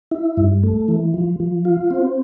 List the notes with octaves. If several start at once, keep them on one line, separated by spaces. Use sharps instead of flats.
E4
G2
A3
E3
F3
F3
F4
C4